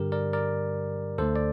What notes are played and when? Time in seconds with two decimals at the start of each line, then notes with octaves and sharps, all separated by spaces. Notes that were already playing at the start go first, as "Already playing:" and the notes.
Already playing: G2 D3 G3 G4 A#4
0.12 A#4 D5
0.33 A#4 D5
1.18 D2 D3 A3 A4 C5
1.36 D5